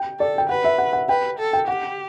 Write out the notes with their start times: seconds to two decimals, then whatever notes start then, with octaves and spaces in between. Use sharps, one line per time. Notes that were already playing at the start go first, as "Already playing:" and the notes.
Already playing: G5
0.19 A4 D5
0.38 G5
0.49 B4 F#5
0.64 E5
0.78 F#5
0.93 F#5
1.09 B4 G5
1.39 A4
1.53 G5
1.68 G4 F#5